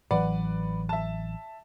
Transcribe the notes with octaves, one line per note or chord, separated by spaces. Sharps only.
A1 E3 F#3 B4 D5 F#5
E5 A5